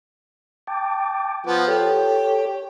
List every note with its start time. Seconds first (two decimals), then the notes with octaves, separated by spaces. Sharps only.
0.67 G5 A5 D6
1.47 F3 B3
1.68 G4 A4 C#5